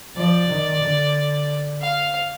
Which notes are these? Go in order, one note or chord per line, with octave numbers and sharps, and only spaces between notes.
F3 D5
D#3
D3
F5